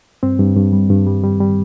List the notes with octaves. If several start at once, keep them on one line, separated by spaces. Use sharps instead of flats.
G2 C4
G2
G2
G3
G2
G3
G3
G3